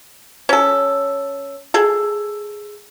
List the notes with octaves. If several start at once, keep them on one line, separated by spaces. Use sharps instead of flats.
C#4 A4
G#4 A4